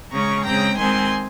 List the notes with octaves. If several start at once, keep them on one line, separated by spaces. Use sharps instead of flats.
C#3 G#3 C#4 A#5 C#6
C#3 G#3 C4 G5 A#5
D#3 G#3 C4 G#5 C6